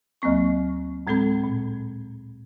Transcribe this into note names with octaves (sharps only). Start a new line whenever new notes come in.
D2 F#3 A#3 C4 C#6
A2 G#3 C4 A4 B5
A#2